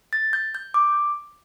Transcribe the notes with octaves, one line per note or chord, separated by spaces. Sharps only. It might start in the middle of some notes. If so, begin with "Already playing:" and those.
A6
G6
G6
D6